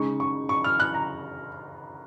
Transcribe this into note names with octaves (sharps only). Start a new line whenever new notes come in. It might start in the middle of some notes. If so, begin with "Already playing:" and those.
Already playing: C#3 G#3 D#4 C#6
C#6
C#6
F6
F#6
A#5